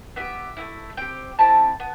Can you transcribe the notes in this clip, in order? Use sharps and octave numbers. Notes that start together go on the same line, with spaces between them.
B3 E4 G4 E5
A3 C4 E4
C4 G4 G5
C4 E4 G4 A5
B3